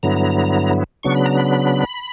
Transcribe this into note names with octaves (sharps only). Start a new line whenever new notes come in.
G2 D3 F#3 B3 E4 A#5
C#3 F#3 B3 D4 C#6
B5
A#5
B5